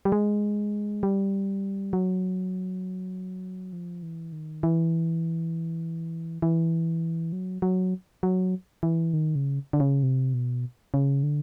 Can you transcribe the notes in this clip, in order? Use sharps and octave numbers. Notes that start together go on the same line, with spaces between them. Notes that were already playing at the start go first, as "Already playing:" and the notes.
G3
G#3
G3
F#3
F3
E3
D#3
E3
E3
F#3
F#3
F#3
E3
D#3
C#3
D3
C#3
C3
B2
C#3
D3